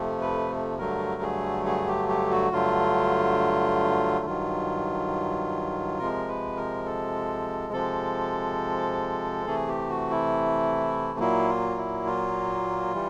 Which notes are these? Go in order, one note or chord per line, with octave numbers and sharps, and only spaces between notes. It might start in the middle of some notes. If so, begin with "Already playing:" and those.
Already playing: F2 C3 F3 A3
B4
G2 D3 F#3 A3 A#4
G#4
G#4
G4
G4
F#4
G2 D3 F#3 A3 F4
G2 D#3 F#3 F4
C3 F3 G#3 A#4
B4
A#4
A4
C3 F3 G#3 A4
C3 E3 A3 G#4
G4
F#4
E4
A#2 F#3 A#3 E4
F4
E4
F4
E3 G3